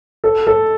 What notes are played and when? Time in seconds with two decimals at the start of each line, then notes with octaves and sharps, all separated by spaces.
0.24 A4
0.47 A4